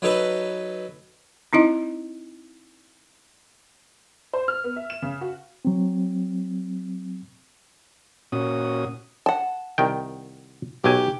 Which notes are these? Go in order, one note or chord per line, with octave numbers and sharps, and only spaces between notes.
F#3 D#4 A4 B4
C4 D#4 E4 D#5
C5
F6
B3
E5
E7
C#3
F#4
F#3 C4
A#2 C#4 F#4 D#6
F#5 A5
C2 D#3 G5
B1 F#3 G4 G#5